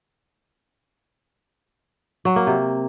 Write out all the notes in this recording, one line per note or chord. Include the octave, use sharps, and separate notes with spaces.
F#3
A#3
C3